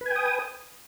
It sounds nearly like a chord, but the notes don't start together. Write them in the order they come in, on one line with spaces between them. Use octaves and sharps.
B4 G#5 G5 D#6